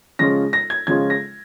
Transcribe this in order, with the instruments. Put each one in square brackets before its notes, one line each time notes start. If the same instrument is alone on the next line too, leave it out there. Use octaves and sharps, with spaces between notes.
[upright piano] C#3 F3 G#3 C#4 F4 A#6
A#6
G#6
C#3 F3 G#3 C#4 F4 G#6
A#6